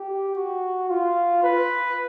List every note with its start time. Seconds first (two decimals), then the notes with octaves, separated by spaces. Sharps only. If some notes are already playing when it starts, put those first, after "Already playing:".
Already playing: G4
0.36 F#4
0.89 F4
1.43 B4